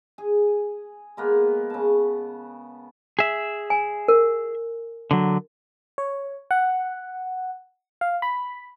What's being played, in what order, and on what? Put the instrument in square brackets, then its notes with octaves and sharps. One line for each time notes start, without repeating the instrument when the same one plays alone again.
[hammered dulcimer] G#4
G#3 A#3 B3
C#3 A5
[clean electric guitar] G#4 E5
[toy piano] G#5
A#4
[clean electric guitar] D3 F#3
[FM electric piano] C#5
F#5
F5
B5